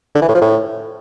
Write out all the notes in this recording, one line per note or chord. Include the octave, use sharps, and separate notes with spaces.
D3
E3
A2
F3
A2